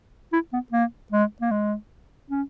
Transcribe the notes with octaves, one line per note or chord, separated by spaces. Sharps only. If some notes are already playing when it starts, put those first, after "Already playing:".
E4
B3
A#3
G#3
A#3
G#3
C#4